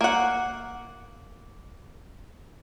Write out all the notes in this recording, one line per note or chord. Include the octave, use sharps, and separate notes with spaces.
A#3 F#5